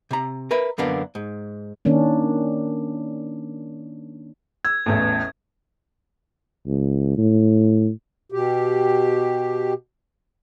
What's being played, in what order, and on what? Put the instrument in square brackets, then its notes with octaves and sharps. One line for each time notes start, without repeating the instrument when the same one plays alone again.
[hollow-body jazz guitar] C3 A#5
A#4 B4 E5
F#2 D3 A#3 B3 D4
G#2
[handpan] D#3 A#3 C#4 D4
[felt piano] E6 [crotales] G#6
[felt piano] A1 E2 A2
[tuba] C#2
A2
[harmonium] B2 G4